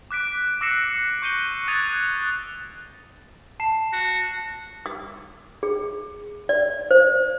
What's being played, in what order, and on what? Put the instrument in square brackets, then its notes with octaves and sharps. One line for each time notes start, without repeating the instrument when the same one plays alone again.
[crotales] D6 F#6 B6 D7
D6 E6 A#6 C7 C#7 E7
C#6 G6 D#7 G7
D#6 F#6 G#6 A6 D#7 F7
[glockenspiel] A5 C7 E7
[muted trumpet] F#4
[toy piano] D#6
G#4
D5
C5